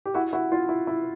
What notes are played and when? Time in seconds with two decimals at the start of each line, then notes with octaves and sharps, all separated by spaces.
0.06 G4
0.14 E4 F#4
0.33 E4 F#4
0.52 F4
0.69 E4
0.87 E4